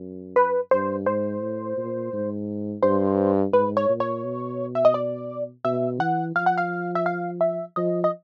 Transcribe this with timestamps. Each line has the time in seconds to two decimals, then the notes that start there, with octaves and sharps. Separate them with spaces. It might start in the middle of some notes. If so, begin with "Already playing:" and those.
Already playing: F#2
0.36 B4
0.71 G2 C5
1.06 G#2 C5
1.42 A2
1.77 A#2
2.13 G#2
2.83 G2 C5
3.53 G#2 B4
3.77 C#5
3.89 A#2
4.00 C#5
4.24 B2
4.75 E5
4.85 D#5
4.94 D5
5.65 B2 E5
6.00 E3 F#5
6.35 F3 F5
6.46 F#5
6.58 F5
6.95 E5
7.06 F5
7.41 E5
7.76 F3 D#5
8.04 D#5